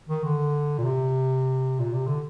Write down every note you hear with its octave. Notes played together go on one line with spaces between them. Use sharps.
D#3
D3
A#2
C3
A#2
C3
D3